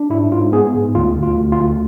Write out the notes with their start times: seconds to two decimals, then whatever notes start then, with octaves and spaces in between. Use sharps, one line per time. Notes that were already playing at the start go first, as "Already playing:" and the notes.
Already playing: D4
0.10 G#2 E4
0.32 G#2 F4
0.52 B3 G#4
0.74 G#2
0.95 D2 F4
1.16 D2
1.23 F4
1.38 D2
1.52 F4
1.58 D2